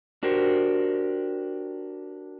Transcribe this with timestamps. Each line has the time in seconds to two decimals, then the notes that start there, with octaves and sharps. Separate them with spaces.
0.23 D4 F#4 G4 A#4 C5